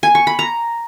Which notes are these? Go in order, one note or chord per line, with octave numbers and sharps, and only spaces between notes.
G#5
C#6
B5
A#5